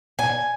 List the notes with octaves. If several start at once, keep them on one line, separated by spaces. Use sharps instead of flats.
G#5